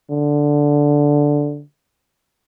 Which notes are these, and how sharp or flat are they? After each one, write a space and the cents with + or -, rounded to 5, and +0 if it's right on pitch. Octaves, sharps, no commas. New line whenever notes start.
D3 -5